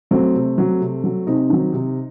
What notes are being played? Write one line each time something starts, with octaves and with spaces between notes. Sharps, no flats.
F#3 A3 C4
C3
F#3
C3
F#3
C3 C4 D#4
D#3 F#3
C3